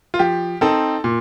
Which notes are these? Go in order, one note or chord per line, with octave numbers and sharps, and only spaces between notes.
F4
F3 G4
C4 D#4 A4
A#2